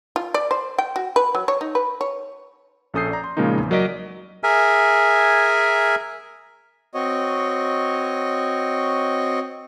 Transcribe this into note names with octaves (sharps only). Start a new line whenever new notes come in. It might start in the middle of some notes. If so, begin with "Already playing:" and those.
F4
D5
C5
G5
F#4
B4
F#3
C#5
D#4
B4
C#5
A#1 C#4 A4 D#6 G6 C7
D5 A#5
C6
A#2 C#3 F3 G#3 A#3 D#4
E2
F#3 A#4 D5 D#5 B6 D7
G#4 A#4 E5 G#5
C4 F#4 C#5 D#5